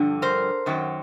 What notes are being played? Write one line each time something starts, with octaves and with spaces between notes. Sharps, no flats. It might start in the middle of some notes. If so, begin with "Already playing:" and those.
Already playing: G2 D3 F3
A#4 C5
F#2 D#3 F#3